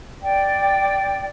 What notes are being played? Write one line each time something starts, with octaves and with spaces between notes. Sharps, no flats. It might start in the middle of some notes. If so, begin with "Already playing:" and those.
D5 G5